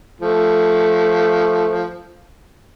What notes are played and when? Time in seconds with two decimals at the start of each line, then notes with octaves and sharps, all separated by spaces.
0.21 F3 A3